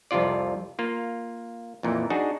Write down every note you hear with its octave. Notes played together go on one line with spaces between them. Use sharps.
C2 F2 C3 F4 D5
A#3 F4
F2 A#2 E3
D4 D#4 F#4 G#4